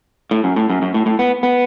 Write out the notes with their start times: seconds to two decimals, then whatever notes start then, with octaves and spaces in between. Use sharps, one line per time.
0.31 A2
0.44 F#2
0.56 A2
0.70 F#2
0.82 F#2
0.94 A2
1.06 A2
1.19 B3
1.43 B3